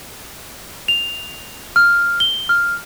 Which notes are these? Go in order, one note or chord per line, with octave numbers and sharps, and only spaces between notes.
F7
F6
G7
F6